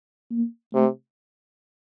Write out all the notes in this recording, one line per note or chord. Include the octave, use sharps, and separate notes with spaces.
A#3
C3 A3